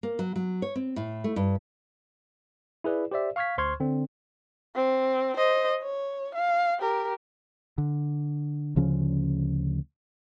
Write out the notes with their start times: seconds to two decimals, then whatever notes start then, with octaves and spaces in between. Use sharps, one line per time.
0.03 A#3
0.19 F#3
0.36 F#3
0.62 C#5
0.76 C4
0.96 A2
1.24 A3
1.36 G2
2.84 E4 G#4 B4 D5
3.11 G4 C5 D5 E5
3.36 F5 C#6 F6 G#6 B6
3.58 D2 C5 C6 C#6 F6 G#6
3.80 D3 C4 D4
4.75 C4
5.37 C5 D#5
5.82 C#5
6.35 F5
6.79 G4 A#4
7.78 D3
8.76 D2 C#3 F3 C#4